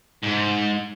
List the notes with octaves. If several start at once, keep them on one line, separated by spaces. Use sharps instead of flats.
G#2